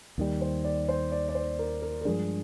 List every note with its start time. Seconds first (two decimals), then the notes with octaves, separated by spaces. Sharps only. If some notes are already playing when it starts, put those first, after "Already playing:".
0.18 D#2 D#3 G3
0.41 C5
0.64 D5
0.88 C5
1.12 D5
1.29 D5
1.35 C5
1.59 A#4
1.82 A#4
2.01 A#4
2.05 G2 F3 G#3 D4 G#4